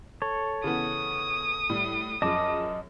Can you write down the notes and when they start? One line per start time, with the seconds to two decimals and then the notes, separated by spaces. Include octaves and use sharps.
0.22 A4 C#5
0.64 C#3 E3 B3 D#6
1.69 A2 G3
2.22 F#2 F3 G#4 D#5 A5 D6